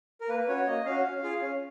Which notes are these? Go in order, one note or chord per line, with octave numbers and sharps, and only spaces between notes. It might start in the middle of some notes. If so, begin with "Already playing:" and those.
A#4
A#3 B4
B4
C#4 F#4 C#5
A#3 D#5
C#4 F#4 F5
C#4
F4 G#4
C#4